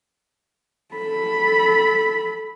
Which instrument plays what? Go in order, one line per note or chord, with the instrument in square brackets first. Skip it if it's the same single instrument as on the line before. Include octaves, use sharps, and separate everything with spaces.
[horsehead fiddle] A4 B5